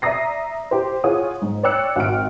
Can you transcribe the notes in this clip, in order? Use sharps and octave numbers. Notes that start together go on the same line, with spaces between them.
D5 E5 A#5 D#6 A#6 C7
G4 C5
F4 G#4 C#5 F#5 D#6
G#2
C#5 D5 G5 E6 F#6 C#7
G#1 F#5 G5 F6 D7